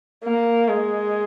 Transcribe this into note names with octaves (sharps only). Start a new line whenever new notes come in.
A#3
G#3